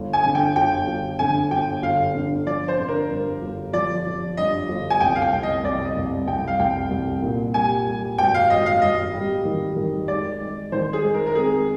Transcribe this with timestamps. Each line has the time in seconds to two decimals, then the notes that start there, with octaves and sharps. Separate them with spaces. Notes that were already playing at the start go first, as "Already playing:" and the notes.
Already playing: G1
0.13 G#5
0.25 D3
0.35 G5
0.56 G1 G5
0.87 G1
1.19 D3 G#5
1.51 G1 G5
1.82 G1 F5
2.15 D3
2.46 F3 D5
2.68 C5
2.79 D3
2.88 A#4
3.10 G2
3.42 G1
3.73 F3 D5
4.06 F3
4.37 G2 D#5
4.69 G1
4.90 G#5
5.00 C2 G5
5.16 F5
5.22 G5
5.33 C2
5.43 D#5
5.64 C2 D5
5.85 D#5
5.96 C2
6.27 C2 G5
6.47 F5
6.59 C2 G5
6.91 C2
7.22 A#2
7.54 G3 G#5
7.86 G3
8.18 G#1 G5
8.34 F5
8.50 G#1 D#5
8.66 F5
8.82 G#1 D#5
9.13 G3
9.45 D#3
9.76 D#3
10.08 G#3 D5
10.40 G#3
10.72 D#3 C5
10.93 G#4
11.05 G#3
11.14 A#4
11.26 A#4
11.35 C4 G#4